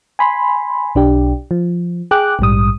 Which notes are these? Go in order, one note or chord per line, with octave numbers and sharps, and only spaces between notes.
G#5 B5 C6
B1 D4 G4
F3
G#4 G5 D6 F#6
A#1 G#2 G3 D#6